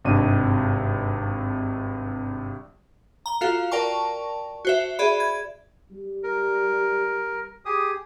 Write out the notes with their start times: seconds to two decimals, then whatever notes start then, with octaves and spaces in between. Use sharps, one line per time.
0.05 G#1 G2 C3 D4 D#5 D#7
3.26 A#5 G7
3.41 F4 F#4 A4 F5
3.72 A#4 D5 G5 A5 C#6
4.65 F#4 C5 E5
4.99 G#4 D5 E5 B5
5.20 G#6
5.91 G3
6.23 A#4
7.65 G4 G#4 D#6